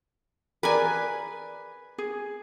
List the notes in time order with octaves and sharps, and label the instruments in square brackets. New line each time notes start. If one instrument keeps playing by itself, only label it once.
[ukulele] G#4 A#4 D5 [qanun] B4 G#5
[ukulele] G#4